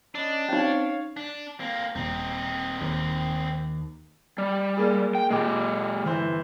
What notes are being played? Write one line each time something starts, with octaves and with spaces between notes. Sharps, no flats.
C#4 D4 D#5 B5
C4 C#4 D#4 C#5 F5
D4
A#3 C4
D#1 C4 D#4
D#2
G3
G#3 A#3 G#4
G5
A#2 G#3 G4
G1 E3 C5